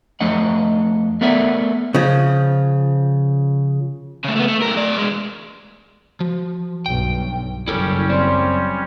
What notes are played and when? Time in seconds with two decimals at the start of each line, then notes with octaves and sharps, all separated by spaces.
0.20 F2 A3 D4 D#5 F#5
1.21 A3 B3 A#4 D5 E5 F#5
1.94 C#3 F3
4.24 C#3 A3
4.36 A3 B3
4.48 A3
4.61 B1 A#4
4.76 A2 D5
4.98 E2 G#3
6.20 F3 F#4
6.86 B1 G2 G5
7.68 F#1 G3 C#4 E4 A4 A#4
8.09 F#2 C4 D5 C6